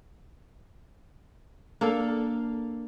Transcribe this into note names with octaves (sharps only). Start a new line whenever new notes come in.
A#3 D4 A4 F5